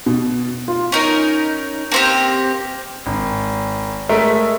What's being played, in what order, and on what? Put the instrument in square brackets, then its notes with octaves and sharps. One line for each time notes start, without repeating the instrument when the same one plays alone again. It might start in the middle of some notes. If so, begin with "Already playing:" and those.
[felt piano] B2
F4
[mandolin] C#4 D#4 A#4
A#3 C4 G4
[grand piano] G#1
G#3 A3 A#4 E5